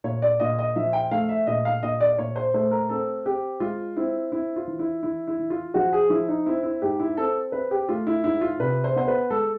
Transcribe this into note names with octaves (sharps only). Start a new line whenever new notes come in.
A#2 C#5
D5
A#2 D#5
D#5
F3 E5
G5
A3 F5
E5
A#2 D#5
F5
A#2 D#5
D5
D5
A#2 C#5
C5
A3 C5
A#4
C4 A4
C4 G4
G#3 F4
C4 E4
C4 E4
F4
E3
E4
E3 E4
E4
E3
F4
F3 F#4
G#4
F3 E4
D#4
C4 E4
E4
G#2 G4
E4
C4 A4
C4 B4
G4
A3 F4
E4
G#2 E4
F4
C3 B4
C5
B3 C5
B4
G#3 A4